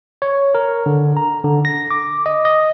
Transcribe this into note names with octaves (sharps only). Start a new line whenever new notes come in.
C#5
A#4
D3
A#5
D3
A#6
D6
D#5
D#5